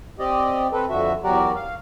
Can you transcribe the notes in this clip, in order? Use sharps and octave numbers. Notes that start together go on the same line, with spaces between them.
C4 G4 D5 D#5
C4 A4 B4
F2 D3 F#4 E5
E2 F#3 F#4 G4 A#4 D5
F5